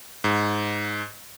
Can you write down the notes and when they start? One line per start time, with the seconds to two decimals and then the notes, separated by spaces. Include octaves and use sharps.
0.24 G#2